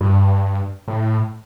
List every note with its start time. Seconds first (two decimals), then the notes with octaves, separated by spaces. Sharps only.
0.01 G2
0.88 A2